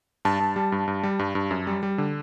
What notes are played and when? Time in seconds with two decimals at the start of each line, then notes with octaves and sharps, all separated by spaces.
0.25 G2 A5
0.40 G2
0.56 G3
0.72 G2
0.88 G2
1.03 G3
1.19 G2
1.35 G2
1.51 F#2
1.67 G3
1.83 G3
1.98 D3